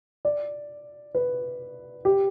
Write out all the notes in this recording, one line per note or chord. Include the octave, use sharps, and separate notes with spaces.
D5
B4
G4